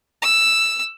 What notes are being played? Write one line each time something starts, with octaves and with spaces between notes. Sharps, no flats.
E6